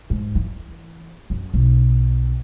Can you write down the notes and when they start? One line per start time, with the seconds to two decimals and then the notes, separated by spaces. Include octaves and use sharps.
0.10 G#2
0.35 E3
1.30 F#2
1.54 B1